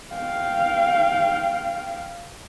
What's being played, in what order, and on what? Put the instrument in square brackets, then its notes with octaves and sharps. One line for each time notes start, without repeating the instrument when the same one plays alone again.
[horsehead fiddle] F5 G5